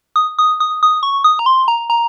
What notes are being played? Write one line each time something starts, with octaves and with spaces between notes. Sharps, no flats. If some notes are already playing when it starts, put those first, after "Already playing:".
D#6
D#6
D#6
D#6
C#6
D#6
A#5
C6
A#5
A#5